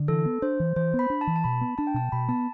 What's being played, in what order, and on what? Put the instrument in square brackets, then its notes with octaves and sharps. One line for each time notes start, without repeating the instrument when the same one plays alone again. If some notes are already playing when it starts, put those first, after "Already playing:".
Already playing: [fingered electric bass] D3
[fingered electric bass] E3 [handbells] A4
[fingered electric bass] B3
[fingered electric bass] D4 [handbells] C5
[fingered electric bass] E3
[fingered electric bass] E3 [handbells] C5
[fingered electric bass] B3
[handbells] B5
[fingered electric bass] D4
[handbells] A5
[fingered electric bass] E3
[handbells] A5
[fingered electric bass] B2 [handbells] B5
[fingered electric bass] B3
[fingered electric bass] D4 [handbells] A5
[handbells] G5
[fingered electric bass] B2 [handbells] A5
[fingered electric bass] B2 [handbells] B5
[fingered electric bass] B3 [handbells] A5